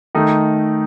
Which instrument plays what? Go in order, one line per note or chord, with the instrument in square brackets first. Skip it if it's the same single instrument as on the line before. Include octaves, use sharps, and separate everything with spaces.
[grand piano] D#3 A3 D#4